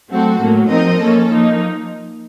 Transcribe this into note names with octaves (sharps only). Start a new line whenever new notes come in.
F#3 A3 C4 F#4 A4
A2 F#3 A#3
F3 C4 D#4 A#4 D#5
F3 A#3 C#4 A4
F3 A#3 D#4